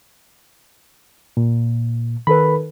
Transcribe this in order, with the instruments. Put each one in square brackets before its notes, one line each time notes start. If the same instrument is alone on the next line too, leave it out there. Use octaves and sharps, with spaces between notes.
[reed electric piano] A#2
[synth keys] D#3 A4 B4 [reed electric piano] B5